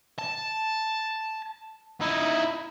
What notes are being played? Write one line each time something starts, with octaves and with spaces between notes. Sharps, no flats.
A5
D#4 E4